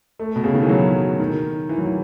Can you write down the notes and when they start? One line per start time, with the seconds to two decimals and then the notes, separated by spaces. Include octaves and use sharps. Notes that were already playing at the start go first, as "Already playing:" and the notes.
0.19 A3
0.36 B2
0.44 C#3
0.53 D#3
0.62 E3
0.69 F#3
1.19 D#3
1.69 E3
1.78 F#3
1.86 E3